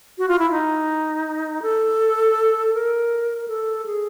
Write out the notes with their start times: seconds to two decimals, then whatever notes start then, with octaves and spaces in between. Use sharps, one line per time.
0.18 F#4
0.28 F4
0.39 E4
0.51 D#4
1.62 A4
2.74 A#4
3.48 A4
3.86 G#4